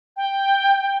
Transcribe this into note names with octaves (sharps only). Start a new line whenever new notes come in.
G5